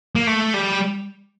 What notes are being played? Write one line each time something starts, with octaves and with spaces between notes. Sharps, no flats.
A#3
A3
G3